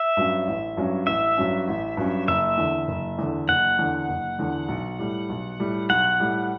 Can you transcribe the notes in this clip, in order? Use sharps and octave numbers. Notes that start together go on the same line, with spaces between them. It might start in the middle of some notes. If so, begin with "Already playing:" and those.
Already playing: E5
G2 F#3 C#4
A1
G2 F#3 C#4
A1 E5
G2 F#3 C#4
A1
G2 F#3 C#4
F#1 E5
E2 D3
F#1
E2 D3
F#1 F#5
E2 D3
F#1
E2 D3
B1
A2 G3
B1
A2 G3
B1 F#5
A2 G3